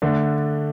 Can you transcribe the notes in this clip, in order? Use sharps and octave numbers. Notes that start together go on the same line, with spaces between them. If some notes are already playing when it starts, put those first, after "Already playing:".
D3 A3 D4